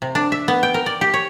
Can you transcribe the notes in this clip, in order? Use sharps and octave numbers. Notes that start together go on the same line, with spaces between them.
C3
D4
E5
B3
G5
A#4
D5
G4
C#5